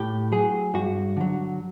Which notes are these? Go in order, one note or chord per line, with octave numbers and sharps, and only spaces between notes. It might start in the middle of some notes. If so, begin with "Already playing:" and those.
Already playing: A2 G4
F#3 G#4
G2 F#4
D3 F#3